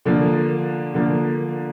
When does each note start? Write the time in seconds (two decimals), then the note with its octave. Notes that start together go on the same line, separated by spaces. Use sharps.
0.05 D3 F3 A#3
0.94 D3 F3 A#3